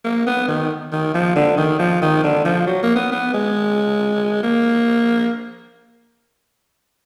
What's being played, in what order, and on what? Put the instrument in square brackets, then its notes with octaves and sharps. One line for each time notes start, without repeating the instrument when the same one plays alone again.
[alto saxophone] A#3
B3
D#3
D#3
F3
D3
D#3
F3
D#3
D3
F3
F#3
A#3
B3
B3
G#3
A#3